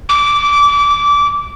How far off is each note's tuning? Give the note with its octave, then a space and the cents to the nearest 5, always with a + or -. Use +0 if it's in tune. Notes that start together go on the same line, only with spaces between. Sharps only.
D6 -20